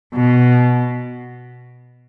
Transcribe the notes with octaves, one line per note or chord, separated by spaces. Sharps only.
B2